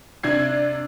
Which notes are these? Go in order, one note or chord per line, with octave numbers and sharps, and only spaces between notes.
C3 D4 G#6 C7